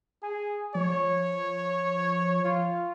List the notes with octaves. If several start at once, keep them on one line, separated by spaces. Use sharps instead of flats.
G#4 G#5
F3 C#5
F4